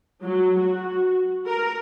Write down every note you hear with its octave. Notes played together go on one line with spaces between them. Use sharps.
F#3
F#4
A#4